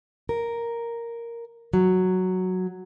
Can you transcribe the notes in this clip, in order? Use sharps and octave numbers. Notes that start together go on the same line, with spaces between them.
A#4
F#3